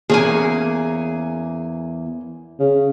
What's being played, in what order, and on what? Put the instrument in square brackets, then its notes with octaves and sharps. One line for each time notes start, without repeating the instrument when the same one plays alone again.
[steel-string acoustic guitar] E2 G#5 [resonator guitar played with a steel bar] A#3 C#4 G#4
[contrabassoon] C#3